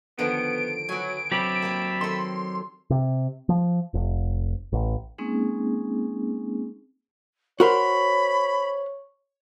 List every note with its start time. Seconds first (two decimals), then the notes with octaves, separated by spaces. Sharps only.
0.19 D3 D#3 F3 B3 D7
0.89 F#3 B3 G#5
1.32 F#3 C4 G4 E5 A5 B5
1.62 G3 A#3
2.01 D#3 A4 C6
2.90 C3
3.49 F3
3.94 F1
4.73 A1
5.18 G#3 A#3 C4 C#4 D#4 G#4
7.60 F#4 A#4 C5 C#5 B5